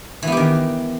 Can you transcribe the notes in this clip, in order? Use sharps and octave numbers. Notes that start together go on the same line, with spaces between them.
D#3 E3 B3 G4